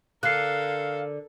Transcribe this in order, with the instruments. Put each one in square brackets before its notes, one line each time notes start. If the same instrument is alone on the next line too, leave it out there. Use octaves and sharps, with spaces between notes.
[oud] D3 [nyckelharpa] A4 A#4 [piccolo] F5 [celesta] F#6 C7